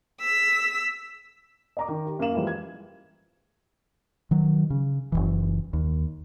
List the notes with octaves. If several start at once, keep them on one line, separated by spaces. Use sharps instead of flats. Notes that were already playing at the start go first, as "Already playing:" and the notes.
E6 B6
D#5 A#5 D6
D#3
G4
F#2 A#3 A#4 F5 E7 F#7
E3 F3 G3 G#3
G#6
D#3 F#3
C#3
F#1 C2 E3
D#2